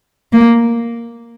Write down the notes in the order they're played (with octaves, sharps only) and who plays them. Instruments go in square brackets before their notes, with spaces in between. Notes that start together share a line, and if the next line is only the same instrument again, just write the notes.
[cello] A#3